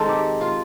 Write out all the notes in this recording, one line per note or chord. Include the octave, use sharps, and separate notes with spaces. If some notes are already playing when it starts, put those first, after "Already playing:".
Already playing: D#3 G#3 C4 A4
G4
F4